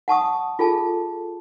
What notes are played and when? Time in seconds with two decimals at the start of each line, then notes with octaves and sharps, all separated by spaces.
0.08 F#5 A5 C#6 D#6
0.59 F4 G#4 A4 A5